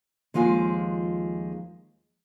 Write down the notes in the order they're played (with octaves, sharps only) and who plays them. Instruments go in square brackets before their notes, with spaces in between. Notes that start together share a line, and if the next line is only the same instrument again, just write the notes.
[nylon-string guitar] D#2 F3 G#3 F4 G#5